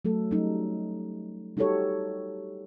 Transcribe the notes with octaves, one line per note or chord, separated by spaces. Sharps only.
F#3 A3 A4
F#3 G3 A3 C#4 D#4
G3 D#4 F#4 G4 A4 C#5